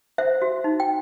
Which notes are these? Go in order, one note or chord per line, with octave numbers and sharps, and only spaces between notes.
C5 E5
F#4
D#4
G5